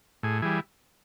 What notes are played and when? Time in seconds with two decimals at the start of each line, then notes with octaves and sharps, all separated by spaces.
0.23 A2 G#4
0.42 E3 G3 G#4